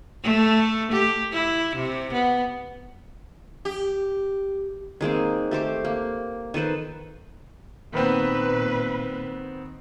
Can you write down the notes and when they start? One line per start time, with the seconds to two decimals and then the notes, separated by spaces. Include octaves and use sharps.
0.23 A3
0.92 G4
1.32 E4
1.76 C3
2.13 B3
3.65 G4
5.01 D#3 G#3 A#3 C4
5.51 A3 G4 C5 D6
5.85 A#3
6.54 D#3 A4 B4 C5
7.93 A#2 D#3 B3 C4 B4